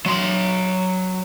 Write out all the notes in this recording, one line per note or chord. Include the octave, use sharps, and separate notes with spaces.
F#3 C6